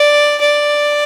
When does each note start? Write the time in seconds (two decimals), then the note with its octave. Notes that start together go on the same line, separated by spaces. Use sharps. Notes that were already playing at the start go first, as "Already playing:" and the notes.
Already playing: D5
0.41 D5